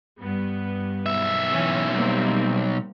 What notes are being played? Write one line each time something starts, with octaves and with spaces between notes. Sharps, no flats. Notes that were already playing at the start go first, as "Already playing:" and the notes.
G2 B3
B1 E5
E3 C#4
G3 A#3 C4